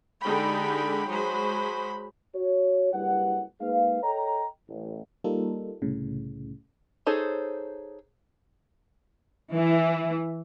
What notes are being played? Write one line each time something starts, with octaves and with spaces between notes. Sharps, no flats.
D3 G#3 D#4 G4 G5 B5
F#3 G#3 C5 B5
F#4 C#5
F#1 G2 G3 E4 B4 F#5
G#3 A#3 D#4 G#4 B4 F5
A4 C#5 D#5 G5 A#5
A1
G3 A#3 D#4 F4 A4
C2 A2 C#3
D#4 G#4 A4 C5 C#5
E3